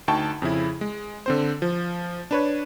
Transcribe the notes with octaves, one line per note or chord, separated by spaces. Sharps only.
D2 D#4 G5 A5 C#6
F2 C#3 E4
G#3
D3 C4 C5
F3
D4 B4 C#5